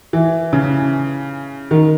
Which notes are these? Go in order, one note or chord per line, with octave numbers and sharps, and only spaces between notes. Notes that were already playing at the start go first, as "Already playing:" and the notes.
E3
C#3
D#3